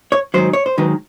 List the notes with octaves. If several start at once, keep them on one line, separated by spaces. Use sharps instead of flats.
C#5
G#2 D#3 F#3 C5
C#5
C5
G#2 D#3 F#3 B4